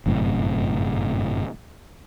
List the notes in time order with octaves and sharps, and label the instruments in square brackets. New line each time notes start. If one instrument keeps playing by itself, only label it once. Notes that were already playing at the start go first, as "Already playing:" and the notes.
[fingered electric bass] G1 F#2 A2 C3